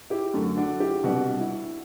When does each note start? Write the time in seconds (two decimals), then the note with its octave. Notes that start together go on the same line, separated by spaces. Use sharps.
0.10 E4 G4
0.34 F#2 D3 A3
0.57 D4 F#4
0.80 E4 G4
1.03 C2 B2 G3 D4 F#4
1.40 E4